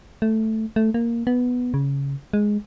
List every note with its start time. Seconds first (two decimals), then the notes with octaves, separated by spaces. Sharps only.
0.22 A3
0.76 A3
0.94 A#3
1.27 B3
1.74 C#3
2.33 G#3